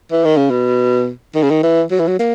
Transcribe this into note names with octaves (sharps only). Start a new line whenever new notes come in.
E3
D#3
C#3
B2
D#3
C#3
D#3
E3
F#3
E3
F#3
A#3